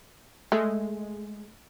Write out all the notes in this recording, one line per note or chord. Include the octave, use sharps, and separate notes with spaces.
G#3 A3